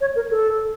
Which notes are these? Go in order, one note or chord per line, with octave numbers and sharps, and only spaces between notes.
C#5
A#4
A4